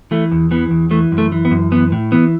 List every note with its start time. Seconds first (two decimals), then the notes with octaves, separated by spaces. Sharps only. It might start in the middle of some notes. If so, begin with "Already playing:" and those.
0.11 E3 A3
0.32 E2
0.51 E3 B3
0.71 E2
0.91 E3 A3
1.12 F#2
1.18 A3
1.32 E3
1.45 B3
1.51 F#2
1.72 E3 B3
1.92 A2
2.12 E3 B3